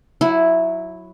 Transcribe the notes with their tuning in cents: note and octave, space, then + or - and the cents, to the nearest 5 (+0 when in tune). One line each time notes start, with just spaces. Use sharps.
F#3 -10 E4 +0